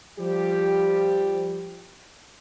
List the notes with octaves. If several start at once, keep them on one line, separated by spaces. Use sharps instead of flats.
F3 G3 G4